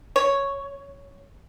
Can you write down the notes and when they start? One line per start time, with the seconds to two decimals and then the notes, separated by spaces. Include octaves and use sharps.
0.16 C#5